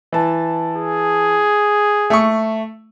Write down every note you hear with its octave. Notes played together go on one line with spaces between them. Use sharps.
E3 A5
G#4
A3 C#6